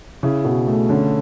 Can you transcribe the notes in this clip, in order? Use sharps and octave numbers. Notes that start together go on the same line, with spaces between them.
C#3 E4
B2
A3
D3 C#4